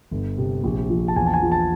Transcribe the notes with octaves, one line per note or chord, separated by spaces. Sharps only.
G1
C3
A#1
F3
A5
E2 G#5
A5
G#5
F3
A5